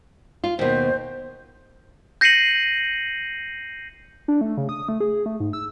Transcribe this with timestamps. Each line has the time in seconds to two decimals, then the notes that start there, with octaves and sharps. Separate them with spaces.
0.44 F4
0.59 D#2 B2 C5
2.21 G6 A#6 C7 C#7 D#7 F#7
4.28 D4
4.41 A3
4.57 C#3
4.69 D#6
4.89 A3
5.00 G#4
5.26 A3
5.40 G#2
5.53 E6